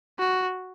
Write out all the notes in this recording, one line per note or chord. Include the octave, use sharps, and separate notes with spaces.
F#4